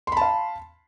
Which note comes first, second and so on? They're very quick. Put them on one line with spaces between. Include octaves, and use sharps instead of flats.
C6 B5 A5 F5